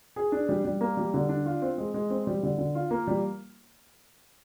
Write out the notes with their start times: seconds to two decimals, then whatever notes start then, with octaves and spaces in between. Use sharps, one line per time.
0.16 G#4
0.32 D4
0.49 G3
0.65 G3
0.81 A#3
0.97 G3
1.14 D3
1.29 D4
1.46 F4
1.62 C4
1.78 G#3
1.94 G#3
2.10 C4
2.27 G3
2.43 D3
2.58 D3
2.75 F4
2.91 A#3
3.07 G3